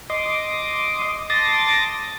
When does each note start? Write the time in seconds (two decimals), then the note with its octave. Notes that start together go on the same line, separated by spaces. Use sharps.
0.10 D#5 C6 D6 D#6
1.30 A5 C6 D6 D#6 A6 A#6